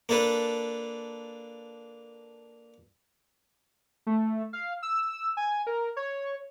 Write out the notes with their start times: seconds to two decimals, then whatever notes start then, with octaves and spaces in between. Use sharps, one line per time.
0.09 A#3 D4 A4 B4
4.07 A3
4.53 F5
4.83 E6
5.37 G#5
5.67 A#4
5.97 C#5